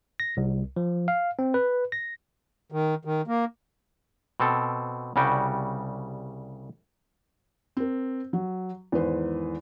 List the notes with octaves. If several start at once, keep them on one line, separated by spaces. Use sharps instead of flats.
A#6
C2
F3
F5
C4
B4
A#6
D#3
D#3
A#3
B2 C4 A4
C2 C#3 G3 F#4 G5
C4 A#4
F#3
E2 G#2 D#3 B4 C5